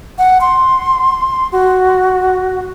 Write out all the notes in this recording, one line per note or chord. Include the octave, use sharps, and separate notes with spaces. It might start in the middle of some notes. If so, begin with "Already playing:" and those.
F#5
C6
F#4